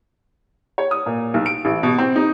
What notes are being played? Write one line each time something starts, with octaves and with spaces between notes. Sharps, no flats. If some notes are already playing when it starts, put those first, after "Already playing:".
C#5
D#6
A#2
B1
D7
A1
B2
C4
D#4